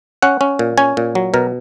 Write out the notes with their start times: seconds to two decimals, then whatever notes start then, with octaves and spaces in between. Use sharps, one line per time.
0.22 C#4 F#5
0.41 C#4
0.59 A#2
0.78 C#4 G#5
0.97 A#2
1.15 F#3
1.34 B2 A#4